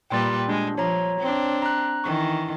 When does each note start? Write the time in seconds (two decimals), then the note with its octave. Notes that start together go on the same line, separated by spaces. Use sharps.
0.10 A#2 G3 B4 G5 C6 A6
0.48 G#3 D4
0.78 F3 C#5 A#5
1.20 C4 D4
1.62 A#5 F#6
2.04 D#3 E3 C#6